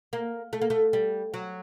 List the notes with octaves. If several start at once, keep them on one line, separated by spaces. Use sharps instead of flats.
A#3
A3
A#3
A3
G3
F#3